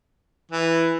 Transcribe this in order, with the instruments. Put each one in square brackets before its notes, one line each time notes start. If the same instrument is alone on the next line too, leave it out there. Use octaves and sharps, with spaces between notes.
[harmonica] E3